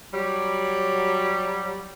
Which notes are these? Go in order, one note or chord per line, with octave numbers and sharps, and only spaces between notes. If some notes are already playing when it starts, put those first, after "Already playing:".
F#3 G3